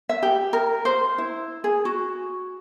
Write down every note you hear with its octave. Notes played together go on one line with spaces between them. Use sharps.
E5
G4
A#4
C5
E4
G#4
F#4